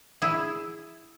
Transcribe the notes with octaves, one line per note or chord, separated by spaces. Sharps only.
E4 G#4